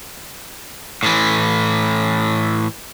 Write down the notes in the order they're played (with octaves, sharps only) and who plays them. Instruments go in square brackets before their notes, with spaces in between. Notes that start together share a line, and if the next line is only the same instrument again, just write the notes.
[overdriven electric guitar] A2 E3